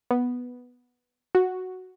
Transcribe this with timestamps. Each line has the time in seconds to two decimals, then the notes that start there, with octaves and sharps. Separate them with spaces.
0.11 B3
1.35 F#4